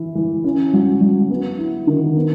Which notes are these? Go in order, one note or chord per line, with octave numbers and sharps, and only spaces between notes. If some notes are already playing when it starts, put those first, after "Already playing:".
Already playing: E3 E4
E3
C#4
F#3
F#3
B3
E4
D#3
B3